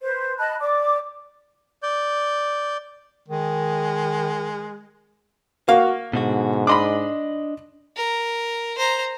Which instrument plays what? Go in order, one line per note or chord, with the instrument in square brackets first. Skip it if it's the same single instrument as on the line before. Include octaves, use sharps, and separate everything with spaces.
[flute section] B4 C5
D#5 A5 B5 F#6
D5 D6
[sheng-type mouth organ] D5 G6
[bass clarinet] D#3 [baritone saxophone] G#3
[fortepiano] A#3 [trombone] F#4 [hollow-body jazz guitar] F5
[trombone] G#2 [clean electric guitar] B2 D3 F#4
[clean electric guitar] D4 D#5 [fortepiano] B5 C6 D6
[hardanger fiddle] A#4
C5 A#5